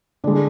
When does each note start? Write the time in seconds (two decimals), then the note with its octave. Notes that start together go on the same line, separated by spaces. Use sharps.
0.24 D3 G#3 D4 D5